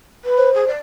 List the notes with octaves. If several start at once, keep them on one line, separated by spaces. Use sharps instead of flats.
B4
C5
G#4
D5